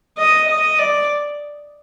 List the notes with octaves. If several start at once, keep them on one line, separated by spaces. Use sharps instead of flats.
D#5
D#5
D5